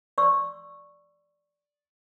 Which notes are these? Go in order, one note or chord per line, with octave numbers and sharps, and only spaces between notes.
D5 C6 C#6 E6